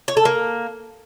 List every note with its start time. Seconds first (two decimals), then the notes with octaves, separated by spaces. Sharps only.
0.08 C#5
0.17 A4
0.25 A#3